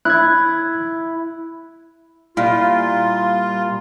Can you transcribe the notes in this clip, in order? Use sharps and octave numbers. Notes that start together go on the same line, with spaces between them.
E4 F#6 G#6
A#2 G3 E4 F4